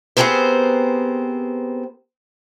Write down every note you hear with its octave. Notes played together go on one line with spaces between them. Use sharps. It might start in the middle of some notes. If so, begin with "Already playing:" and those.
B3 C4 G4 G#4 A#4 C5